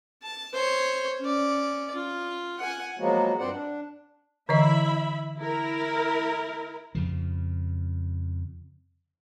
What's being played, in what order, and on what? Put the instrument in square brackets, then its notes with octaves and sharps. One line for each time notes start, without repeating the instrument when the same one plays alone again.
[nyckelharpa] A5
C5 C#5
C#4 D5
F4
F#5 G#5
[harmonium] F3 F#3 G#3 A#3 B3 F#4
G2 C4 C5 D5 F#5
D4
[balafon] D3 E3 D#5 [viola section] E4 E5 B5
[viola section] E4 A#4
[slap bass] F2 C#3 F3